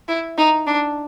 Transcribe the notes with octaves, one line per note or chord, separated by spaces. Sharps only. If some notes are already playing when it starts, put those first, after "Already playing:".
E4
D#4
D4